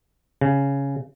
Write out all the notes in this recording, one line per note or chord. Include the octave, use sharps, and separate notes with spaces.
C#3